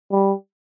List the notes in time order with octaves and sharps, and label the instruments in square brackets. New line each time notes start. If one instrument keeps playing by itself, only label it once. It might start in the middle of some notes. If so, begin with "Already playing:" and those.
[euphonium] G3